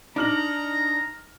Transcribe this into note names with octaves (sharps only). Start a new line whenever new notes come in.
D4 D#4 A#5 F6 F#7